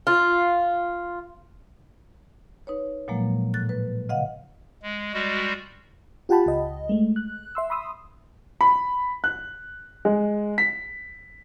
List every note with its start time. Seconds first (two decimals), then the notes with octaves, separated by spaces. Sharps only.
0.07 F4
2.67 D#4 B4 C#5
3.08 A#2 F3 F#3 G#3 A#3
3.54 A2 F#6 A6
3.69 B4
4.09 C#3 D#5 F5 F#5
4.82 G#3
5.13 G3 G#3 F#4
6.29 F4 G4 F#5 G5 A5 B5
6.46 C#2 D#5
6.89 G#3 A3
7.16 F#6
7.55 E5 C6 E6
7.70 B5 C6 D#6 E6
8.61 B5
9.24 F#6
10.05 G#3
10.58 B6